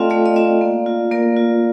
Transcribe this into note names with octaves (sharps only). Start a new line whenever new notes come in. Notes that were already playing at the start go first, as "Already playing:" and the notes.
Already playing: A3 C4 F4 A4 D5 D#5 F5 G5
A3 D5 F5
D#5
C4 F4 D5 F5
A#3
F4
A#3 A#4 D5
F4